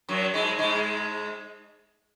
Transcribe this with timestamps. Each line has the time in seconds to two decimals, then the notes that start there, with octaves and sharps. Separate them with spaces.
0.09 F#2 F#3
0.34 G#2 G#3
0.58 G#2 G#3